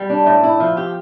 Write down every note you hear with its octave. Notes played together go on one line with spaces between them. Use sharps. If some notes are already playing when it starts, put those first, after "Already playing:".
Already playing: G3
D4
A2
E4
F3
G4